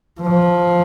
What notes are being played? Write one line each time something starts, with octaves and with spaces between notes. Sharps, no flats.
F3